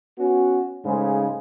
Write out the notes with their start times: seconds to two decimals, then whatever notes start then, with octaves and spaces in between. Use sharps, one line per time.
0.19 B3 C#4 F#4
0.85 G#2 C#3 G#3 A3